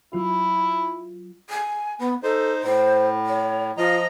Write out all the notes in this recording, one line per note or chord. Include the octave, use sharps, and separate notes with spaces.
F#3 E4 F4
G#5
B3
D#4 A4 C5
A2 C5
C#5
F3 F4 D#5 A#5